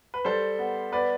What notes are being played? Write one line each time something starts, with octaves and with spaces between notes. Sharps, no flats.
B4
G3 A4 C5
B3
B3 B4 D5